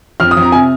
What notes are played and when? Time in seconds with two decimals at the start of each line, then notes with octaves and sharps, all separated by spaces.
0.20 F2 F6
0.31 D#6
0.37 F2
0.42 A#5
0.52 C3 G#5